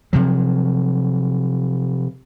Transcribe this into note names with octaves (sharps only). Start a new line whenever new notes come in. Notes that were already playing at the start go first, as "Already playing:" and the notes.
C3 F3 F#3